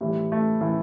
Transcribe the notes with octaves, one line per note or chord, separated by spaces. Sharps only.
A2 E3 G3
A3
A2 E3